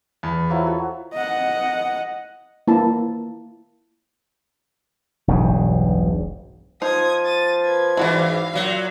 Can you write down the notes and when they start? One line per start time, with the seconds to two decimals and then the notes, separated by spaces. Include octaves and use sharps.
0.23 E2
0.50 F3 F#3 E4
0.65 F#4 A4
1.14 D#5 F#5
2.68 A#3 E4 A5
5.28 E1 B1 G2 C#3
6.82 F3 D#4 C5 D#6 G#6
7.25 A6 D#7
7.62 B4 G#6
7.97 G#2 E3 E4 F#4 D5 F5
8.53 A#2 F#3